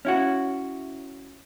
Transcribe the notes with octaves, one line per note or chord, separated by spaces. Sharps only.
C#4 E4 F#4